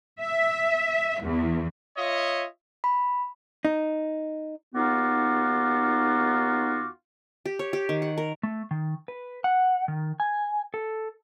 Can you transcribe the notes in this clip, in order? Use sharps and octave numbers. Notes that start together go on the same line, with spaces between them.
E5
E2
F4 C#5 D#5 E5
B5
D#4
D#2 B3 D#4 F4 F#4 D6
G4
C#5
G4
D#3
F#5
A#4
A3
D#3
B4
F#5
D#3
G#5
A4